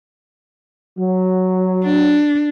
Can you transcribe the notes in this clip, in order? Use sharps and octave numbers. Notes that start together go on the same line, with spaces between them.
F#3
D4